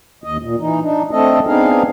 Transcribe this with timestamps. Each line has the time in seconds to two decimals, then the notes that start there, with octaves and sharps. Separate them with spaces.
0.24 D#2 D#5
0.43 A#2
0.60 E3 D#4
0.82 D4 D#4
1.11 A3 C4 D4 A4 D#5
1.47 B3 C4 D4 D#4 G#4 F5